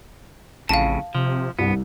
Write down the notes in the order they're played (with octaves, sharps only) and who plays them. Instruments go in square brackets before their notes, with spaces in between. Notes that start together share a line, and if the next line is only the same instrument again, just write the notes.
[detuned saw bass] A1 [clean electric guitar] F2 A2 C#3 [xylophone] F5 A5
[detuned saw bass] C3 [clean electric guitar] F3
[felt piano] C2 [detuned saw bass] G2 [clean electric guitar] B3